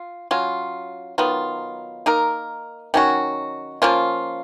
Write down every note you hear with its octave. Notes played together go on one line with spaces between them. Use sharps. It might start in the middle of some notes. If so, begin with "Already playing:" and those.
Already playing: F4
F#3 C#4 F4
D#3 F#3 B3 F4
A#3 D#4 A#4
D#3 F#3 C#4 F#4
F3 A#3 C#4 F4